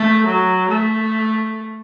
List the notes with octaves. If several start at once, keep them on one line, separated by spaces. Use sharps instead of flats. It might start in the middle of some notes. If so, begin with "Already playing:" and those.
Already playing: A3
F#3
A3